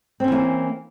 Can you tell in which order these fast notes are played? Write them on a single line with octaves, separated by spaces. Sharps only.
C4 C#4 E3 A#3